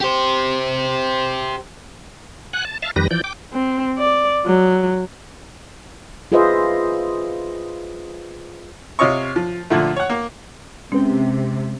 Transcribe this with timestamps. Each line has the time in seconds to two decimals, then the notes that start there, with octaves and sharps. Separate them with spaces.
0.01 G4 C5
2.53 F#5 G#5 F#6
2.65 A5
2.82 E5 F5 A5
2.96 F2 D#3 G3 G4 B4 A#6
3.11 E3 F3 D5 G6
3.24 G5 D6
3.53 C4
3.98 D5
4.46 F#3
6.32 F4 G#4 B4 C5 D#5 E5
8.99 C3 F4 C#5 D#5 C#6
9.36 F3
9.70 A#2 D3 F3 A3
9.96 C#5 F#5
10.10 A#3
10.92 C3 G#3 C4 C#4 B4 G5